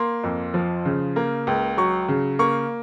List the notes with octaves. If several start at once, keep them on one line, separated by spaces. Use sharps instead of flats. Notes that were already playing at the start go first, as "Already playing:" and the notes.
Already playing: A#3 C6
F2
F3
C#3
A#3
C#2
F#3 C#6
C#3
A#3 C#6